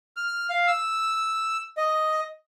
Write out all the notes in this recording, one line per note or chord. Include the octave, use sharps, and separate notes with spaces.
F6
F5
E6
D#5